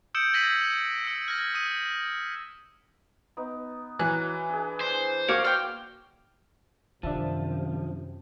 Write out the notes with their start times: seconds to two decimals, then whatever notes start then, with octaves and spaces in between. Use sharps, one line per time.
0.15 D#6 E6 G6 C#7 D7 E7
0.33 E6 G#6 A#6 B6 D#7 F#7
1.04 E6 C#7
1.28 F6 G#6 A#6
1.54 D#6 D#7
3.37 B3 D#4 D6
3.99 E3 F#3 F#6
4.49 D4 G#4
4.81 D4 C5
5.28 A#3 F#4 A#4 C#5 F5 D6
5.44 G5 C6 F6
7.03 F#2 C3 D#3 F3 D4 E5 A5